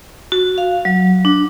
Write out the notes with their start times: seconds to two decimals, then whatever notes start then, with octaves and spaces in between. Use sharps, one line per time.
0.32 F#4
0.58 F5
0.85 F#3
1.25 D4